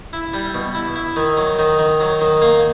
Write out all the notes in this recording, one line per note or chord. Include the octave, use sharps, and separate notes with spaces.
E4
G3
B2
E4
E4
D#3
F#3
D#3
D#3
F#3
D#3
A#3